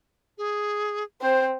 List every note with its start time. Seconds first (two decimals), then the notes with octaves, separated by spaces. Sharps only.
0.38 G#4
1.21 C4 C5